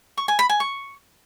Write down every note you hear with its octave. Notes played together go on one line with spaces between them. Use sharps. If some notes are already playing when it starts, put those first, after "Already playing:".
C#6
G#5
B5
G#5
C#6